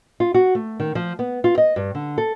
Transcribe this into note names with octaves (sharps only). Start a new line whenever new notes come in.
F4
F#4
A3
D#3
F3
B3
F4
D#5
G2
D3
A4